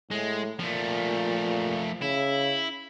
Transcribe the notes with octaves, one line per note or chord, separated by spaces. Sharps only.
A2 G#3
A#2 F3 A3
C#3 E4